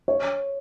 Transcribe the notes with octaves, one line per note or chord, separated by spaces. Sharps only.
C#5